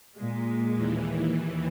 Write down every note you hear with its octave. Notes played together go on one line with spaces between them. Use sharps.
A#2 G#3
D#2 E3